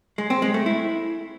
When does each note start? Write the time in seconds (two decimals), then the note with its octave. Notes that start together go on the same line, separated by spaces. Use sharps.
0.18 G#3
0.30 C4
0.42 G#3
0.54 A3
0.66 E4